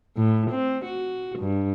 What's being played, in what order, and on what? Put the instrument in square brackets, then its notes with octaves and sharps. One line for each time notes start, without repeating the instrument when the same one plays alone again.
[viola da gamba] A2
C4
F#4
G2